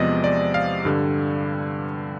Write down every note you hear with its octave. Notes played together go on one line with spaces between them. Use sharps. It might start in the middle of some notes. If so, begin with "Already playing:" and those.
Already playing: E2 C3 F3 G#3 B3 D5 D#5
D5
F5
G2 D3 G3